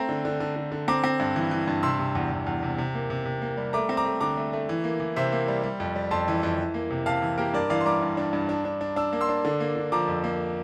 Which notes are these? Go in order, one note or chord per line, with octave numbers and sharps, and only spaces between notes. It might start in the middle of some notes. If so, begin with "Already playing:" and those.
Already playing: A3 C4 G5 A#5
D3
D3
D3
D3
D3
C4 A#5 D6
C4
G2
E3
E3
G2
C3 C6 E6
C3
E2
E2
E2
C3
C3
A#3
C3
C3
A#3
G3
A3 A#5 D6
C4
A#5 D6
A3
D3 A#5 D6
A3
A3
E3
A#3
E3
C3 C5 E5
A#3
G3
G3
F2
G3
F2 A5 C6
E3
F2
E3
A#3
C3
C3 F5 A5
E3
A#3 G4 A#4
G2 A#4 D5
E3 D5 F5
C6
G3 A#5 D6
G2
D4
G2
D4
D4
D4
D4 E6
A#3
C6 E6
D4
D3
A#3
D3
F3 A#5 D6
F2
A#3